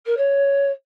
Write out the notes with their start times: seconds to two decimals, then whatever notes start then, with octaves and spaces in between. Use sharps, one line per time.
0.06 A#4
0.17 C#5